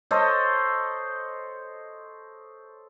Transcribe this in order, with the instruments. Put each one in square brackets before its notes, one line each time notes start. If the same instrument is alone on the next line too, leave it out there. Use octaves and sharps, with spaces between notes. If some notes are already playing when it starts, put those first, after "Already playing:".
[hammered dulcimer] A4 C5 C#5 D#5